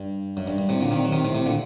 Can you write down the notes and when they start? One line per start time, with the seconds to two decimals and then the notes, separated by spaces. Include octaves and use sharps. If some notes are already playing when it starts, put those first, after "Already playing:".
Already playing: G2
0.37 F#2
0.48 G2
0.58 G2
0.69 A2 C3
0.81 A#2 D3
0.91 C3 D#3
1.05 F#3
1.13 C3 D#3
1.24 A2 C3
1.35 A2 C3
1.46 A#2 D3